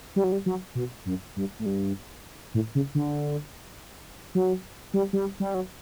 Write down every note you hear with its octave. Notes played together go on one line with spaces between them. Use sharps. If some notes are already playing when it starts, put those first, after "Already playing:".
G3
F#3
G3
F#3
B2
F#2
G2
A2
G2
A2
C#3
D3
F#3
G3
G3
G3
F#3